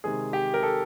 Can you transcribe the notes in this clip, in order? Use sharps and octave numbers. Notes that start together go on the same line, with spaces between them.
C3 D#3 G#3 G#4
G4
A#4
A4